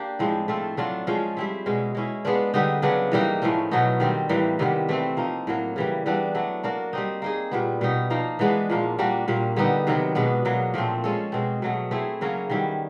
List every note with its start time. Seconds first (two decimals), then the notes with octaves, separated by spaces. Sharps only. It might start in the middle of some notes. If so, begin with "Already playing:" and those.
Already playing: A#3 D4 G4
0.19 A2 F3 G#3 C4
0.48 A3 C4 F4 A4
0.77 F#3 A3 D4 F4
1.07 F3 G#3 C#4 F4
1.37 G3 C4 E4
1.66 B2 G#3 C#4
1.95 G#3 C#4 E4
2.25 G#3 B3 D4 F4
2.54 D3 G3 B3 D#4
2.82 C#3 F#3 B3 D4
3.12 E3 G3 A#3 D#4
3.42 A2 F3 A3 C#4
3.71 B2 F#3 B3 D#4
4.00 D#3 G3 C4
4.29 A2 E3 G3 A#3
4.59 C3 D#3 G3 B3
4.89 E3 A3 C4
5.17 F3 A#3 D#4
5.47 A2 F#3 A#3
5.76 C#3 E3 G3
6.06 E3 G3 B3 D4
6.35 F#3 A3 D4
6.63 A#3 D4 F#4 A#4
6.93 G3 C4 D#4
7.22 A#3 D#4 G#4
7.51 A#2 G3 B3
7.81 B2 G3 B3 D#4
8.10 F3 A#3 D#4
8.39 E3 G#3 B3 D4
8.70 A#2 F3 A#3
8.98 G3 A#3 D4 F#4
9.28 A#2 G3 A#3
9.56 D3 G3 B3 D#4
9.87 C3 D#3 F#3 B3
10.15 B2 G#3 B3 D4
10.45 B2 F#3 A#3
10.74 A#2 F3 A3 C4
11.04 G#3 C#4 F4 A4
11.32 B2 G#3 C4
11.62 B2 F#3 A3
11.91 A3 C4 E4 G#4
12.21 C#3 F#3 A#3 C#4
12.50 D#3 G3 B3 E4